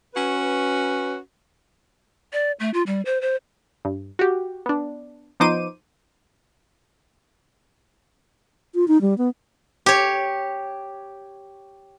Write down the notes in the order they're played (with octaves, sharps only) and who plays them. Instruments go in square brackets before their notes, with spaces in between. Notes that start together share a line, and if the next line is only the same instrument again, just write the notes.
[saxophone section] C#4 F#4 B4
[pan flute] D5
A3
F4
G3
C5
C5
[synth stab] G2
F#4 G4
B3 D4
F3 B3 D#4 C5 D6 D#7
[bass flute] F4
D#4
G3
B3
[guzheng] G4 C#5